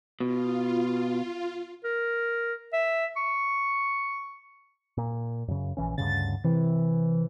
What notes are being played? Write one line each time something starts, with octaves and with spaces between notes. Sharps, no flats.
B2 F4
A#4
E5
C#6
A#2
F#2 C#3
A#1 E3 C#4
D2 G2 C#3 A6
C3 E3